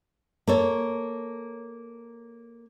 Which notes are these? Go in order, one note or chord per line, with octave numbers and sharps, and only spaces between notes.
A#3 A4 C#5